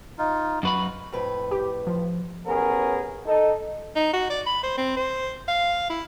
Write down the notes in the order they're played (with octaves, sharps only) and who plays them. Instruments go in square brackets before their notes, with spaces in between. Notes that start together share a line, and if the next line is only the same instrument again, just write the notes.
[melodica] D#4 F4
[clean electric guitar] F#2 B4 B5 [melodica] F#4
[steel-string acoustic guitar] F2 A2 B4
[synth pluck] G4
F3
[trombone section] A1 B3 C#4 G#4 A#4
D#4 A4
[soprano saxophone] D#4
F#4
D5
B5
C5
C4
C5
F5
E4